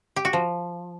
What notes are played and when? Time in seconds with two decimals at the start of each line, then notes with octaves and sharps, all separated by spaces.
0.16 G4
0.25 F#4
0.33 F3